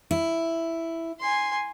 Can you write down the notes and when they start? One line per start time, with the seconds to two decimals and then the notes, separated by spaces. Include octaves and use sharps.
0.11 E4
1.21 G#5 C6